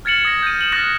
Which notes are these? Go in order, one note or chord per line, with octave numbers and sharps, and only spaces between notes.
F6 G#6 A6 C#7 E7 F#7
D#6 G#6 A#6
G6 D#7
E7 F#7
D#6 F6 F#6 A6 A#6